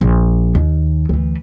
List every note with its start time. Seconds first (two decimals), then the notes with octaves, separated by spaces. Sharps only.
0.01 A#1
0.55 D#2
1.09 D2 E3